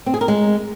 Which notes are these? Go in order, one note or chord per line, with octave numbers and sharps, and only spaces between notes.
C4
G#4
A#4
G#3